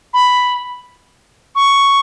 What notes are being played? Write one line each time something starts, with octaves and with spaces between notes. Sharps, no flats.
B5
C#6